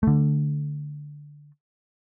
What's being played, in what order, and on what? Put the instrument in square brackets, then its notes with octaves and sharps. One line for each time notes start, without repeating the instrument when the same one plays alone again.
[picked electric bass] D3 A3